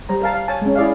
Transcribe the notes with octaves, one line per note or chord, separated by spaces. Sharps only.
G3 C5 A#5
A#4 F5 A5
F5
C#5 G#5 A5
G#3 C#4
E4 G#4 D5 E5 F5